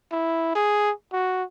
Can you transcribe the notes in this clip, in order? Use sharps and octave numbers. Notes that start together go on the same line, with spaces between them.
E4
G#4
F#4